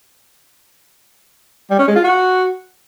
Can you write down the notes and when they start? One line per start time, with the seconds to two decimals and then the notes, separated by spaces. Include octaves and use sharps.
1.70 G3
1.79 C#4
1.87 G#3
1.96 F4
2.04 F#4